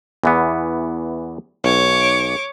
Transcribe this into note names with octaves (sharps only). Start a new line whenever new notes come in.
E2 E3 B3
B1 C#5 D6